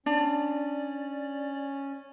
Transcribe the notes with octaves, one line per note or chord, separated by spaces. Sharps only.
C#4 D4 D5